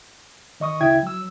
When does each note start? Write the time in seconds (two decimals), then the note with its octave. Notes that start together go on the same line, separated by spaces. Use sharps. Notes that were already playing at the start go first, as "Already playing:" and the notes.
0.60 D#3 D#5 C#6 D#6
0.81 D2 C#3 E4 E5 G5 G#6
1.03 F#3 E6